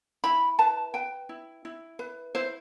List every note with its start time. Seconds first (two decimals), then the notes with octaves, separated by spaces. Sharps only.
0.24 E4 B5
0.59 B4 A5
0.94 B4 G5
1.29 E4
1.65 E4
1.99 B4
2.35 E4 C5